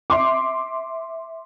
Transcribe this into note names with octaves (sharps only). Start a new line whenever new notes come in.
E5 C6 D6